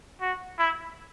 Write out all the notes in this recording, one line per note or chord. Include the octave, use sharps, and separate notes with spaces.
F#4
E4